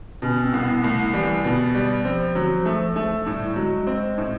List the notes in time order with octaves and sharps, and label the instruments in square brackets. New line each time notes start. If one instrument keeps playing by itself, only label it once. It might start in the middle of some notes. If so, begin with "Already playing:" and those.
[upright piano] B2 [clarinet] C#4
[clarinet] C4
[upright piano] C2
[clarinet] B3
[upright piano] C2 [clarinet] A3
[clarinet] E3 [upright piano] G3
[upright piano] B2
G3
[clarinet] F3 [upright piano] C4
[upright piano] F#3
A3
A3
[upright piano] A2 [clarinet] G3
[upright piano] F#3 [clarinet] G#3
[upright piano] C4
A2